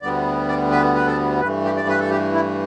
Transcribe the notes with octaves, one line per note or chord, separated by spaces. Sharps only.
D2 D3 G3 B3 D5
D5
B4
B4
A4
G2 E3 A3 B4
G4
D5
B4
A4
G4
E4